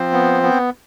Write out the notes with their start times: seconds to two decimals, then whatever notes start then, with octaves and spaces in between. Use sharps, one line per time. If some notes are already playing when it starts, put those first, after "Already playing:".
Already playing: F3 C4 C5
0.13 B3
0.43 B3